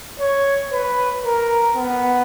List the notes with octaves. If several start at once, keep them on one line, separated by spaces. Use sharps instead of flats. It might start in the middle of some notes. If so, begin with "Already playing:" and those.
C#5
B4
A#4
B3